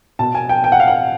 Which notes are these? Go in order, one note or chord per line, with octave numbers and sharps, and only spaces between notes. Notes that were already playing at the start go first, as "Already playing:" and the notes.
B2 A5
G#5
G5
G5
F#5
F5
F#5